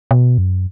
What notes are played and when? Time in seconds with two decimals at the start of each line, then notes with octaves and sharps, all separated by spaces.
0.11 B2
0.38 F#2